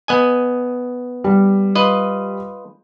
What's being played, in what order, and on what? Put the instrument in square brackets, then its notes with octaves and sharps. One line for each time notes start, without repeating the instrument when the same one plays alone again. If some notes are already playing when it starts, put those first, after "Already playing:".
[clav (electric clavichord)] B3 D#5 G#5
[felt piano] G3
[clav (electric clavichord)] F4 B4 D#5